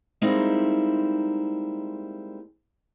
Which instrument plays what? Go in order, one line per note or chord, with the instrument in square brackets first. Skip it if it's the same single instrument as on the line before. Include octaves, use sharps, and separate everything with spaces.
[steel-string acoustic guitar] G3 G#3 A#3 C4 D#4 E4